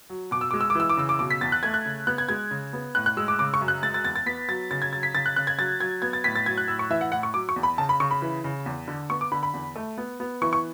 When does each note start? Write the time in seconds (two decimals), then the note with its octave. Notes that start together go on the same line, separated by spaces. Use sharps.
0.10 F#3
0.31 B2 D6
0.41 E6
0.51 G#3 D6
0.61 E6
0.70 D6
0.75 E3 E6
0.89 D6
0.97 C#3 E6
1.09 D6
1.19 B2 D6
1.31 B6
1.41 E2 A6
1.52 F#6
1.63 A3 G#6
1.74 F#6
1.85 C#3
2.07 B3 F#6
2.18 G#6
2.29 G#3 G#6
2.51 C#3
2.73 B3
2.95 A2 F#6
3.06 F#6
3.17 G#3 E6
3.28 D6
3.39 C#3 D6
3.54 C#6
3.61 F#2
3.68 F#6
3.82 G#3 A6
3.94 A6
4.05 E2 A6
4.16 A6
4.26 B3 B6
4.48 F#3 A6
4.71 C#3 A6
4.82 G#6
4.93 F#3 A6
5.03 B6
5.14 C#3 A6
5.26 F#6
5.36 C#3 F#6
5.47 G#6
5.58 F#3 A6
5.80 F#3 G#6
6.02 B3 G#6
6.13 A6
6.24 A2 B6
6.35 A6
6.46 F#3 G#6
6.58 F#6
6.68 A2 E6
6.79 C#6
6.90 E3 E5
7.01 F#5
7.12 A2 F#5
7.23 C#6
7.34 F#3 D6
7.49 C#6
7.56 E2
7.63 B5
7.78 C#3 A5
7.89 B5
8.00 C#3 C#6
8.11 B5
8.22 E3
8.44 C#3
8.66 E2
8.88 D3
9.10 B3 C#6
9.21 D6
9.32 D3 B5
9.43 B5
9.54 E2
9.76 A3
9.98 B3
10.20 B3
10.42 E3 C#6
10.53 C#6